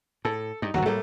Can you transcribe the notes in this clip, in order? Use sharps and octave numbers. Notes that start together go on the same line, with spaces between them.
A2 A4
G2 D#4
G1 D#2 F#3 F#4
A2 G3 A3 A#3